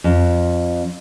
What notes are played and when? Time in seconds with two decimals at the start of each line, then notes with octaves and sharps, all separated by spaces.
0.04 F2